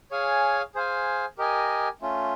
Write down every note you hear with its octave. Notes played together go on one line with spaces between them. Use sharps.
G#4 C#5 F5 G#5
G#4 C5 F5 G#5
G4 A#4 D#5 G#5
A3 C#4 F4